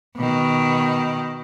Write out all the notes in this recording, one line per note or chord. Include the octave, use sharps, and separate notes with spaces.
B2 D#3